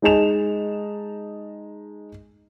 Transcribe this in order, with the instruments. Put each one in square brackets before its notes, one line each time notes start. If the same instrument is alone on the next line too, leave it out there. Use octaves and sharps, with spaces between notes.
[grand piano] G#3 D#4 G#4 A5 E7 F7